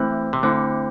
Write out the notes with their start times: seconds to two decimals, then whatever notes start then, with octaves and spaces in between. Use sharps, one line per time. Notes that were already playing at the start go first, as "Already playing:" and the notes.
Already playing: E3 A3 C4 E4 C5
0.33 C3
0.43 D3 A3 C4 E4 C5